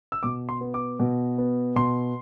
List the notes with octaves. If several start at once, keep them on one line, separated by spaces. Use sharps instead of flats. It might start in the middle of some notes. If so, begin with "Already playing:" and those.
E6
B2 D6
C6
B3
D6
B2
B3
B2 C6